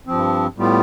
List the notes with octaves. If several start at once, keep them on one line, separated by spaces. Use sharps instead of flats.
G2 F3 C4
A2 G3 B3 F4